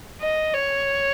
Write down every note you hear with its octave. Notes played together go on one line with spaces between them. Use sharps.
D#5
C#5